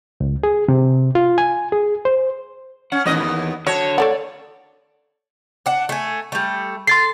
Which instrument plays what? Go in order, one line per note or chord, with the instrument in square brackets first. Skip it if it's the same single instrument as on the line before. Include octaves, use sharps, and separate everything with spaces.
[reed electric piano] C#2
G#4
C3
F4
G#5
G#4
C5
[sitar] C#4 [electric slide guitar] F#5
[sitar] D#2 B3 D#5 [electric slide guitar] E3 C#4 E4
[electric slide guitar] E2
[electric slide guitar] D3 A5 [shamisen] F#3 [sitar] C#5
[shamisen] A3 A4 F#5 [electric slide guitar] D5
[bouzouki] D4 F#5
A3 G#5
G3 A3
[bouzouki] A4 [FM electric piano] C6 A6 C7